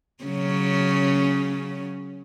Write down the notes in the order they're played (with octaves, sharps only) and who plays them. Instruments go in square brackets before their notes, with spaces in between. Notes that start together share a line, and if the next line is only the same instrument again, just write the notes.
[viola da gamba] C#3 F#3 C#4